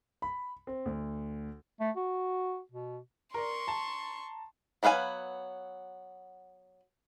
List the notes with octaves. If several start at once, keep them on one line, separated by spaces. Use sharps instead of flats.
B5
C4
D2
A3
F#4
B2
A#4 D5 C6 C#6
A5 A#5
F#3 B3 B4 F5 G#5